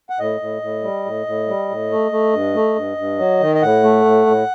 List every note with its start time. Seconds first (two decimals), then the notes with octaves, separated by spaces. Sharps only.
0.10 F#5
0.18 A2 D#5
0.40 A2
0.62 A2
0.83 G3
1.05 A2
1.26 A2
1.48 G3
1.69 A2
1.91 A3
2.11 A3
2.33 G2
2.55 A3
2.76 G2
2.97 G2
3.19 F#3
3.41 D#3
3.55 D#5
3.62 A2 F#5
3.83 A3
4.05 A2
4.26 A2